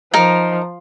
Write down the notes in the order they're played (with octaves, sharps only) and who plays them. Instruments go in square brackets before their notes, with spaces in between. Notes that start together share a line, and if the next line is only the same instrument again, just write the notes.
[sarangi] F3 [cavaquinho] D#4 A#4